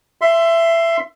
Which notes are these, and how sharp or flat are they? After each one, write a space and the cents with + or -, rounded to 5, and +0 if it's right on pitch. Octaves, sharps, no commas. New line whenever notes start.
E5 +20 C6 +0